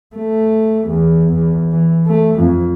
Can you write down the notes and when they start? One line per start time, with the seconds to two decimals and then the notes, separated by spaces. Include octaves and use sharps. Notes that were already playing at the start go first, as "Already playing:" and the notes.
0.16 A3
0.88 E2
1.34 E2
1.72 E3
2.07 A3
2.39 F2